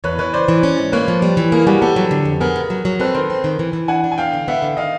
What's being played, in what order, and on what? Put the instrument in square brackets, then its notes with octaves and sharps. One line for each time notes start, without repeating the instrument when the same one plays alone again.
[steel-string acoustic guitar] E2 [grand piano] B4 C#5
[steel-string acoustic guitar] E3 [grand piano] B4 C#5
[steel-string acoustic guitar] C#3 [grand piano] C5 D5
[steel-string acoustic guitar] E3
C#4
G#2
[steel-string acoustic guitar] A#3 [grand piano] B4 C#5
[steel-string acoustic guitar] F3
G3
E3
[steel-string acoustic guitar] A#3 [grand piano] G#4 A#4
[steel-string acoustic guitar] G3 [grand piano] F#4 G#4
[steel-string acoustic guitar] B3 [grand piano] G4 A4
[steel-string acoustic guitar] F#3
D3
F2
[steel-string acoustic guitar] B3 [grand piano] G#4 A#4
[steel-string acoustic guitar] C#3
F#3
F#3
[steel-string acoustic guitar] C4 [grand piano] A4 B4
[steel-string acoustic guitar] D#3 [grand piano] A#4 C5
[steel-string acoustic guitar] C4
D#3
E3
E3
[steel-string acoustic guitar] D4 [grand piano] F#5 G#5
[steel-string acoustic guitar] D4
[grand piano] G#5
[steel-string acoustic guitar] B3 [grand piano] F5 G5
[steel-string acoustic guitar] D3
[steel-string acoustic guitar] B3 [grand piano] E5 F#5
[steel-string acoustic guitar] D3
[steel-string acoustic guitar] D#3 [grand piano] D#5 F5